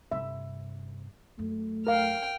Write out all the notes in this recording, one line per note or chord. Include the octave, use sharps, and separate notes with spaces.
G2 C3 E5
F#2 A3
A#4 F5 G5 F6